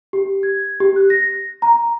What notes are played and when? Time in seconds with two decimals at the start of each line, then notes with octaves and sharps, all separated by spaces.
0.13 G4
0.43 G#6
0.80 G4
0.96 F#6
1.10 A#6
1.62 A#5